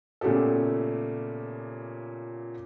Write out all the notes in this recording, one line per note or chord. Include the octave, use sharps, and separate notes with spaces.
A#2 C#3 A3 B3 G4 A4